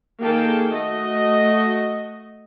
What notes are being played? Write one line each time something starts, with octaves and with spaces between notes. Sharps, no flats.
D#3 A#3 G#4 A4 G5 A5
A3 F#4 D#5